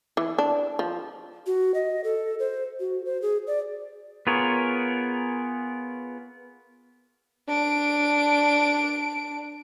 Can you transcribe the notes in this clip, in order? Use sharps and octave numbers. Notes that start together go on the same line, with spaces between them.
E3
D4
F3
F#4
D#5
A4
C5
F#4
C5
G#4
D5
B3 F4 G#4 A#4 C#5
D4 D7